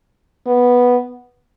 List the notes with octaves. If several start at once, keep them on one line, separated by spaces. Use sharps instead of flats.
B3